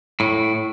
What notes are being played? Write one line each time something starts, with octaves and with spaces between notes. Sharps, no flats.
A2